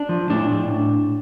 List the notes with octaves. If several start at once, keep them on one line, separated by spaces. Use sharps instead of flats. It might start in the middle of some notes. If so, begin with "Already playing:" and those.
Already playing: D4
F3
A2 D4
A2